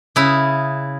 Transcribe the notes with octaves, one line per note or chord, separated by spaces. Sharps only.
C#3 E4